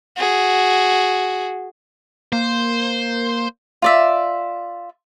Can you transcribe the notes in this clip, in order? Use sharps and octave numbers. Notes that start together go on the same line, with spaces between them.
F#4 G#4
A#3 C5
F4 D5 E5